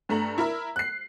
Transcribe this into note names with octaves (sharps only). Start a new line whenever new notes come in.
G2 A3 A#5 F#7
E4 A#4 E5
F#6 C7